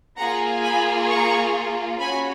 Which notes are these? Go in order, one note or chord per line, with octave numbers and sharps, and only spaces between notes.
A#3 F4 G#4 F#5 A#5
G#5 B5
A#5 C#6
C#4 F#4 G#5 B5